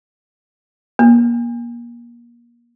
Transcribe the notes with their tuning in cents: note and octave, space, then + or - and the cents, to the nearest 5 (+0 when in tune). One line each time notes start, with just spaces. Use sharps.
A#3 +30